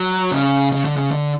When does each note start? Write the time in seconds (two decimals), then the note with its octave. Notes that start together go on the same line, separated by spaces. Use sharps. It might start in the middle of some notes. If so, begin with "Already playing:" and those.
Already playing: F#3
0.31 C#3
0.72 C#3
0.85 D3
0.96 C#3
1.11 D3